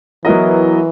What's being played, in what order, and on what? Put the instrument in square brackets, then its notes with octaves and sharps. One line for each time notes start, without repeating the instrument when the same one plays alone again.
[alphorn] E3 [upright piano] F#3 B3 E4 A#4 D#5